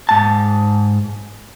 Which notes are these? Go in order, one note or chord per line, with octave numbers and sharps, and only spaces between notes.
G#2 A5